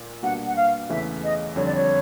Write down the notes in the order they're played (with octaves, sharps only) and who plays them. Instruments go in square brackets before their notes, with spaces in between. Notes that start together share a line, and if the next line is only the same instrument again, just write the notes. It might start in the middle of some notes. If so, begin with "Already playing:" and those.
Already playing: [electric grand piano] A#2
[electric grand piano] B2 G3 A#3 D4 F#4 [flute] F#5
[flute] F#5
F5
[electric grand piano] E2 C#3 E3 A3 [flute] E5
[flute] D#5
[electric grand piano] F2 D3 G3 [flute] C#5
[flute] D5
C#5